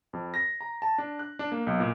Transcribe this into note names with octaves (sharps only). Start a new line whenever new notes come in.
F2
A#6
A#5
A5
D4
F#6
D4
A#3
B1
A#2